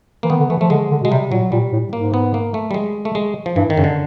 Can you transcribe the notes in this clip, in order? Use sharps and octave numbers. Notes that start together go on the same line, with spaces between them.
E3 A#3
D#3 B3
D3
E3 A3
F3 A3
D3 G#3
D3
B2 G#3
C3 G3
A#2 F#3
A#2 G3
A2
G#2 A#3
B3
A#3
A3
G3
G#3
A3
G#3
F3
G2 E3
D#3
F#2 C#3
D3